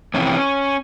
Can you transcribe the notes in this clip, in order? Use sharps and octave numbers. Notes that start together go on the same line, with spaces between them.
F2 C3 E3 C#4